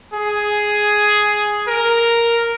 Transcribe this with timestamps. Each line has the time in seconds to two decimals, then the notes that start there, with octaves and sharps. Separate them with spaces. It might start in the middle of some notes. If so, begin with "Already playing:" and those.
0.14 G#4
1.67 A#4